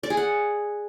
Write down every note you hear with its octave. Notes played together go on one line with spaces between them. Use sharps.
D5
G#4
F#5